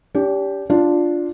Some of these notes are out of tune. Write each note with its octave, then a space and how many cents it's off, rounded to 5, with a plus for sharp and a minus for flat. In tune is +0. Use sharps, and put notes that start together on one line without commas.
D4 -40 G4 +5
D4 +0 F4 +0